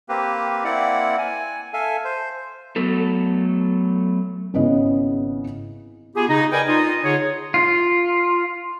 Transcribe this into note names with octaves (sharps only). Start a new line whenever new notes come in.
A#3 C4 G4 B4
A#3 C4 E4 D5 F#5
G#5
A4 E5 F5 G#5
C5
F#3 A3 B3 A4
G#1 C#3 B3 C#4 E4 D#5
B3 F4 G4 G#4
C#3 D#4
A#4 B4 D5 D#5 G5 G#5
D#4 F4 D#5
D3 D#4 F4 G#4 C#5
F4